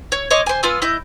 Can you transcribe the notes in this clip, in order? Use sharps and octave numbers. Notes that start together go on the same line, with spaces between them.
C#5
C#5 D#5 C6 D6
C5 G#5
B3 F4 G#5 E6
E4 D#5 G6